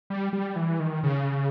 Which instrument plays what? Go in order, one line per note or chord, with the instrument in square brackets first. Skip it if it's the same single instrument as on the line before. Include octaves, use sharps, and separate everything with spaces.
[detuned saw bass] G3
G3
E3
D#3
C#3